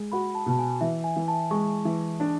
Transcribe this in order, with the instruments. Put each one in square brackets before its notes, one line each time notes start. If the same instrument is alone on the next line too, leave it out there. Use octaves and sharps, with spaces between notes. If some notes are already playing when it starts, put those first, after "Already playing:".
Already playing: [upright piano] G#3
[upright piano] F#4 [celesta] B5
[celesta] A5
[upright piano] B2 [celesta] A5
[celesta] G#5
[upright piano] E3 [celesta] E5
[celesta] G#5
[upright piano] E3
[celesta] A5
[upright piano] G#3 [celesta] C#6
[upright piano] E3
D4